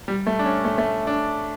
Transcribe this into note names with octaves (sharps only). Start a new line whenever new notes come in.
G3
A3
D4
C#4
A3
A3
D4